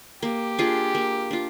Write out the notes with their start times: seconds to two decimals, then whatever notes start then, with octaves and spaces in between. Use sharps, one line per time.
0.22 A#3 G4
0.59 D4 F4 G#4
0.95 A#3
1.31 D4 F4